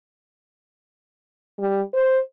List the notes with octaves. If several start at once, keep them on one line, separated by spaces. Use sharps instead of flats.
G3
C5